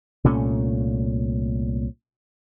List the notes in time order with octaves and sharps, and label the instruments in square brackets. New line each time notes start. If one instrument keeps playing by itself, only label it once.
[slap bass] C2 A#2 A3 C#4